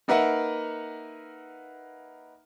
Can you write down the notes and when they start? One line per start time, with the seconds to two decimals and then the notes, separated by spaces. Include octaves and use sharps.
0.08 A#3 D#4 A#4 B4 E5 F#5